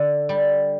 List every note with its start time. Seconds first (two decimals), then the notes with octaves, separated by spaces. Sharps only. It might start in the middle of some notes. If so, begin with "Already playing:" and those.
Already playing: D3
0.29 G3